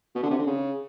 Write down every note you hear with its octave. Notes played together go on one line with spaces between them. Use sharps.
B2
D3
C3
D3
C#3